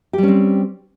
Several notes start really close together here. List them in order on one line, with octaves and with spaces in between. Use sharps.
G4 G3 C#4 C4